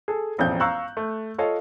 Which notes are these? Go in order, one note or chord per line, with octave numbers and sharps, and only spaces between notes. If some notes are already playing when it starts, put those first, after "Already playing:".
G#4 A4
E1 A1 F2 F4 G6
F5 A#5 C#6 E6 F#6
A3
F4 A4 C#5 D#5 F5